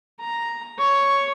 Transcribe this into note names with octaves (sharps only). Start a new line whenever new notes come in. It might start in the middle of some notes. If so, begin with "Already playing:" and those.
A#5
C#5